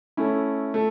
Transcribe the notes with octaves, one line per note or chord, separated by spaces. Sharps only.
A3 C#4 E4
A3